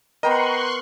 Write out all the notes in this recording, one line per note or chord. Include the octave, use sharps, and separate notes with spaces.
B3 A#4 D#5 G5 A#5 C6 C#6 F#6